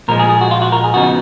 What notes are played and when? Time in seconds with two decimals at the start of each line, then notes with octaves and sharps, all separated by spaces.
0.08 A#2 F3 G#3 A#4
0.19 G#4
0.29 G#4
0.41 F#4
0.51 F4
0.62 F#4
0.72 A#4
0.84 G#4
0.94 C#3 F3 B3 D#4 F#4